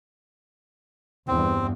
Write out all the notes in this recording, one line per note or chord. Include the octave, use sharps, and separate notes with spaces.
E2 G2 C4